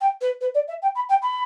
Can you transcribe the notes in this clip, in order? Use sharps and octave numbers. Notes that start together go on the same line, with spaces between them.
G5
B4
B4
D5
E5
G5
B5
G5
B5